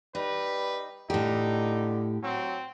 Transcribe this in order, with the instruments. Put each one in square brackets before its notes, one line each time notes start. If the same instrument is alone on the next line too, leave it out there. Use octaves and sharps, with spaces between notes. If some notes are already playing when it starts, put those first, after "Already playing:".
[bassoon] G3 [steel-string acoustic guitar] D#4 [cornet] B4
[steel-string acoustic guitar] A2 G4 [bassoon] D3 [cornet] D#4
[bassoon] F#3 [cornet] C4